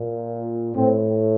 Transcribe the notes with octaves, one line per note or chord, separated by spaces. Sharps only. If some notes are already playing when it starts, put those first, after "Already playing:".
Already playing: A#2
A2 C4